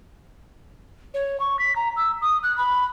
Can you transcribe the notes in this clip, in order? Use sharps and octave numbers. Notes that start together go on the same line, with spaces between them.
C#5
C#6
B6
A#5
E6
D#6
F#6
B5